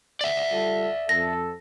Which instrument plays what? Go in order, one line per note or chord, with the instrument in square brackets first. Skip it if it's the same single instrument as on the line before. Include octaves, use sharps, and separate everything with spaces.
[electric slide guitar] D5 E5
[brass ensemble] G3 F4 A4
[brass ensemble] F2 A4 [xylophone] A#6